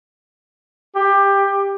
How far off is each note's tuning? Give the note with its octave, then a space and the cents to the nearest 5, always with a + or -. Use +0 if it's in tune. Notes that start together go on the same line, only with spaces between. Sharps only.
G4 +15